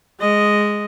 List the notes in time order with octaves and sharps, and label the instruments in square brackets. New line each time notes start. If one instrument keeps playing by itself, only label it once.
[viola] G#3 D#5